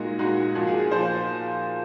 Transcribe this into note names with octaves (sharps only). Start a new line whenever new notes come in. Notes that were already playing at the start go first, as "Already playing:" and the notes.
Already playing: A#2 G#3 D#4 F#4
A#2 G#3 D#4 F#4
A#2 F3 A#3 F#4
G#4
G#4
A#2 F3 A#3 C5